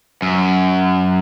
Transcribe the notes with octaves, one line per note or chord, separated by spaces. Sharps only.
F#2